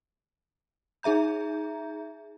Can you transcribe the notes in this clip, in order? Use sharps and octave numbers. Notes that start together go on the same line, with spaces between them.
D#4 G#4 E5 A#5 G6